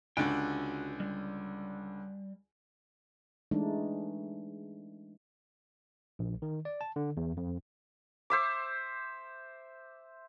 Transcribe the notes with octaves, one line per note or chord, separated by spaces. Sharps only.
C#2 D3 F#4 B4 G5
G3
E3 G#3 A3 D4 D#4
A#1
D#3
D5
A5
D3
E2
F2
C5 E5 D6